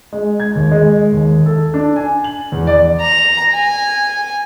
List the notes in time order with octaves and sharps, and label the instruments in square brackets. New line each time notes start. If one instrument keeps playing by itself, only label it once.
[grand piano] G#3
G#6
D#2
G#3
D#2
A4
D4
G#5
F#7
E2
D5
[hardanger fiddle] A#5
G#5